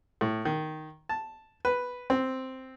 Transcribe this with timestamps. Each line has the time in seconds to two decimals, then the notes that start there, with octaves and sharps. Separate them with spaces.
0.21 A2
0.45 D#3
1.09 A5
1.65 B4
2.10 C4